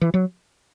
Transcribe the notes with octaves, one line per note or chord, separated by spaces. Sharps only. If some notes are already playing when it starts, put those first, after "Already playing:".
E3
F#3